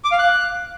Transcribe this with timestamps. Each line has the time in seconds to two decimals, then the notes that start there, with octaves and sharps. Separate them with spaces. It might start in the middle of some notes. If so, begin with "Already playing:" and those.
0.04 D6
0.11 F5
0.19 F#6